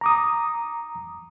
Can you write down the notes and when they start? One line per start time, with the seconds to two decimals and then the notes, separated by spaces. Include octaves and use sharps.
0.01 A#5 D6 D#6